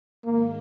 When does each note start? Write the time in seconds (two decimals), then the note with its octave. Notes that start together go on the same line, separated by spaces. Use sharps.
0.24 G#2 D#3 G#3 A#3